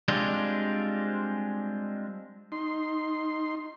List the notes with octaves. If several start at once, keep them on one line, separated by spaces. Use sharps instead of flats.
G3 G#3 C4 D4 F4
D#4 C6